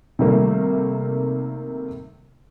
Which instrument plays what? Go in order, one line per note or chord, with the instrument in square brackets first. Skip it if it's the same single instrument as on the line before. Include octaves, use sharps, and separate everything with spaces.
[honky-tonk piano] C3 D#3 G3 A3 A#3